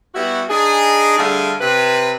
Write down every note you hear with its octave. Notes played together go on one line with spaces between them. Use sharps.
G3 B3 E4 F#4
D4 D#4 G#4
D3 G3 A3 G#4 F5
C3 B4